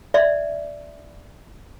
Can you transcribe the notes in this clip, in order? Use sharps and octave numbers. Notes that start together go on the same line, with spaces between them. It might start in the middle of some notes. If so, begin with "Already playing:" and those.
D5 E5